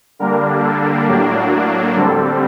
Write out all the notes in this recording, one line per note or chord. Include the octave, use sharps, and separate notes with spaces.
D3 G3 A#3 D4 A#4
A4
A2 F#3 A#3 D4 G4
F#4
D3 G3 C4 A4